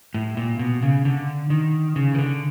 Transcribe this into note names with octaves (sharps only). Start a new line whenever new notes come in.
A2
A#2
B2
C#3
D3
D#3
C#3
D#3
D3